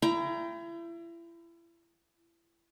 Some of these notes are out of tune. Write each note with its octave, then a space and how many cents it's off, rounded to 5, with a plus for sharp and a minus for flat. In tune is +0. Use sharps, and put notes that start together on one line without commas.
E4 +35 G5 +0 A#5 +20